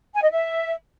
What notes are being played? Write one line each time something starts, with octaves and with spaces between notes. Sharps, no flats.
G#5
D#5
E5